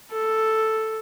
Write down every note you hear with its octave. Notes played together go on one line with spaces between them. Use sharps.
A4